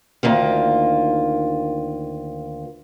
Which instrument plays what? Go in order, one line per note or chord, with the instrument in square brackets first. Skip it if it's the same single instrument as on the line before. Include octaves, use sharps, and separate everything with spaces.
[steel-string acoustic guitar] D2 D#3 A#3 F4